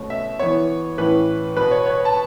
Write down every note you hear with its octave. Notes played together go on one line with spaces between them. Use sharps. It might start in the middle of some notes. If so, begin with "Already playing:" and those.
Already playing: B2 A3 C#4
E5
E3 B3 C#5
A2 E3 C#4 B4
B2 B3 B4
C#5
C#5
A5